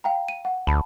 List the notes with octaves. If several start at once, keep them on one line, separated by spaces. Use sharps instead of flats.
F5 G5 A#5
D#7
F#5
D2 A5 B5